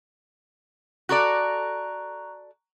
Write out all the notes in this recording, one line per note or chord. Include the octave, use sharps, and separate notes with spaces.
F#4 A4 D5 A#5 C#6 F#6